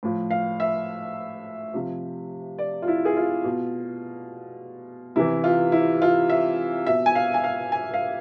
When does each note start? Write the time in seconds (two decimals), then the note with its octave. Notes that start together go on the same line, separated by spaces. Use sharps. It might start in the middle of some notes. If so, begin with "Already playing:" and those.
0.03 A2 F3
0.31 F5
0.60 E5
1.74 C3 F3
2.59 D5
2.82 F4
2.88 E4
3.05 G#4
3.16 F4
3.44 B2
5.16 C3 E3 E4
5.44 F4
5.72 E4
6.02 F4
6.30 E5
6.87 B2 E5
7.06 G#5
7.15 F5
7.34 G#5
7.44 F5
7.72 G#5
7.94 F5